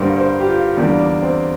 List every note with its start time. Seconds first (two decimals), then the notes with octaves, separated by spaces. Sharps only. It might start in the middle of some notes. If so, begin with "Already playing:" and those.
Already playing: G2 D3 G3 A#3 C5
0.17 C5
0.40 G4
0.47 F4
0.77 E2 D3 G3 A#3 D4
0.99 D4
1.22 C4